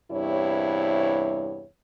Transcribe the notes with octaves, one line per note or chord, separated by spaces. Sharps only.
E2 G2 C3 E4 C#5